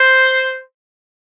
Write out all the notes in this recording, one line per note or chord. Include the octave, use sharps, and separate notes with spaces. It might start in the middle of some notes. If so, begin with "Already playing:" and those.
Already playing: C5